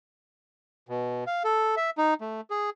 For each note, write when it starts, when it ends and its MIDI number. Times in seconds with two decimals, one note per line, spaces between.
0.89 1.24 47
1.27 1.43 77
1.44 1.75 69
1.77 1.90 76
1.98 2.14 63
2.21 2.41 57
2.50 2.70 68